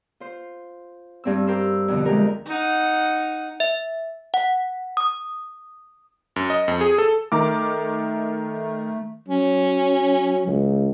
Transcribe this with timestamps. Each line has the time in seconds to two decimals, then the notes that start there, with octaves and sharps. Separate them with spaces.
0.20 F4 C5
1.24 G2 C4 E6
1.47 G4 A#4 C5 E6
1.88 F2 B2 D3
2.05 D2 G#3 G4 A#4
2.46 D#4 F#5
3.60 E5
4.34 F#5
4.97 D#6
6.36 F#2
6.50 D#5
6.68 F2
6.81 G#4
6.98 A4
7.32 D#3 A3 A#4 D6
9.29 F#3 C#4
10.47 C#2